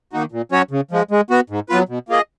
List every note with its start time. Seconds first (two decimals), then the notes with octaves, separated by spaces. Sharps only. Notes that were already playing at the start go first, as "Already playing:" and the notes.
0.13 D#3 A#3 D#4 F#4
0.32 A#2
0.52 F#3 C#4 F#4 C#5
0.71 C#3
0.91 F3 G#3
1.11 G#3
1.30 B3 F#4
1.50 G#2
1.69 F#3 B3 F4 B4
1.89 B2
2.09 A#3 F4 G#4 D#5